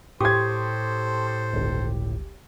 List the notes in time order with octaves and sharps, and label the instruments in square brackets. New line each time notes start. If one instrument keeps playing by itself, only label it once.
[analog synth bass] A2 [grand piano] G4 G#6 [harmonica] A4 C5 [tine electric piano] C6 C#6 D#6
[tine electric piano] G1 C#2